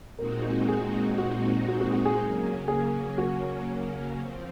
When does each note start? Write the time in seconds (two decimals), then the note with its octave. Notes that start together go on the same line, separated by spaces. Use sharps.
0.18 A#2 G#3 C4 D#4 F#4 A#4
0.68 G#4
1.18 F#4
1.68 F#4
1.81 F#4
1.93 F#4
2.05 G#4
2.18 C#3 F#3 A#3 C#4
2.68 G#4
3.18 F#4
4.19 F3 C4